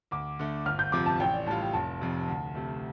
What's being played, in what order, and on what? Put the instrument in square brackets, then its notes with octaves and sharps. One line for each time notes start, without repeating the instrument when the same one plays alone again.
[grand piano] D2 [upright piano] D6
[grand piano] D3 A3
[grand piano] G1 [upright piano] F6
[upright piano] G6
[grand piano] F2 C3 F3 [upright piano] D6
[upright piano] A5
[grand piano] A1 [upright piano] G5
[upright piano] D5
[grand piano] A2 G3 F4 [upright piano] A5
[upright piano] G5
[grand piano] F1 [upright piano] A5
[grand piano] F2 C3
D2
C3 A3